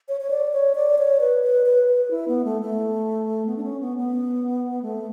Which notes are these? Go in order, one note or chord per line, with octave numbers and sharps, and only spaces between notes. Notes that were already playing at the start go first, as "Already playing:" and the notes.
C#5
C#5
D5
C#5
D5
C#5
B4
B4
B4
B4
E4
B3
A3
A3
B3
D4
C#4
B3
B3
A3